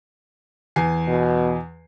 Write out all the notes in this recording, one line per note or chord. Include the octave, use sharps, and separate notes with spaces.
E2 G#5 C7
B2